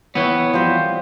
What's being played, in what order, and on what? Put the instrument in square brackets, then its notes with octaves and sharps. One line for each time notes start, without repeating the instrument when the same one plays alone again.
[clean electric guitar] E3 B3 [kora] C4 [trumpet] C#5
[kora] F3 G3 F#4 [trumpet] C5